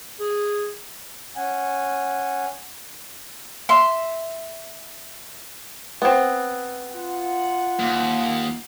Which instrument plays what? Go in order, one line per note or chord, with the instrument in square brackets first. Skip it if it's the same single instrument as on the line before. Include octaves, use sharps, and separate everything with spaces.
[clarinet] G#4
[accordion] C#4 F#5 G#5
[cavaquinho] E5 C6
[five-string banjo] B3 C4
[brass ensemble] F4 F#5
[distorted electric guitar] D#2